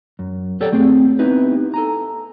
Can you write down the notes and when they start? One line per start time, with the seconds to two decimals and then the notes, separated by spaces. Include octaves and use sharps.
0.19 F#2
0.61 G4 A4 C#5 D5 F#5 G5
0.73 A3 C4 G#4 G5
1.19 B3 C4 D#4 E4 G4 B4
1.74 A4 G#5 A#5